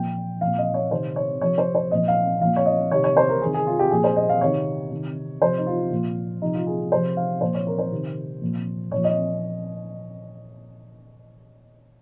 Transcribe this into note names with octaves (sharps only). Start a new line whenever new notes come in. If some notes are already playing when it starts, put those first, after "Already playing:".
Already playing: A#2 F3 G5
A#2 F3 F5
D#5
C#5
C3 D#3 C5
C#5
C3 F3 C#5
C5
C5
A#2 F3 D#5
F5
A#2 F3 F5
C#5
D#5
C3 D#3 C#5
C#5
C5
A#4
C3 D#3 G#4
G#4
F4
G4
A#2 F3 G#4
C5
D#5
F5
C3 D#3 C#5
C3 D#3
C3 F3 C5
D#4
F4
A#2 F3
C3 F3 D#4
F4
G#4
C3 F3 C5
F5
A#2 F3 C5
C#5
A#4
C5
C3 D#3
A#2 F3
A#2 F3 C#5
D#5